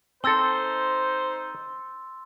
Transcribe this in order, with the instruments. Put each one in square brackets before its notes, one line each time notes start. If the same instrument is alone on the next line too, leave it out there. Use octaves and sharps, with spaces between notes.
[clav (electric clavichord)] C4 A4 [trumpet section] D#4 C5 [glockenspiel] C6 E6 A6